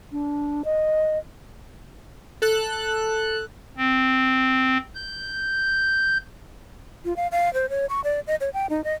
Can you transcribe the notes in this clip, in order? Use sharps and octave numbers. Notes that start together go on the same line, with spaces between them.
D4
D#5
A4 F#6
C4
G6
F4
F5
F5
C5
C#5
C#6
D5
D#5
C#5
G5
D#4
D#5